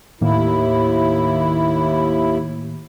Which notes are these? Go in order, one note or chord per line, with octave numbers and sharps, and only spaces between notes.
D#2 A2 D#3 A#3 E4